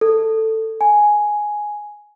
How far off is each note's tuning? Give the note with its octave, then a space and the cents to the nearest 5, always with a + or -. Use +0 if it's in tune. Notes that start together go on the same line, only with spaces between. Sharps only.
A4 +10
G#5 +5